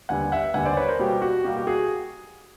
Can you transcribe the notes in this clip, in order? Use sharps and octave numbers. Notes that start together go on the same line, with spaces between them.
D#2 D3 G3 B3 F#5 G#5
E5 F#5
D#2 D3 G3 B3 F#5 G#5
C5 D5
B4 C#5
A#4 C5
B2 G3 A#3 G4
F#4
B2 G3 A#3 G4
G4
F#4 G#4